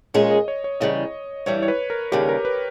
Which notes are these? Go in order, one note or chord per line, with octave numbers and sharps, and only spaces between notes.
A#2 G#3 C#4 G#4 C#5
D#5
C#5
C#5
E2 C#3 G3 D#5
G2 E3 G3 C#5
C#5
B4
A#4
D#2 C#3 G3 G4
A#4
B4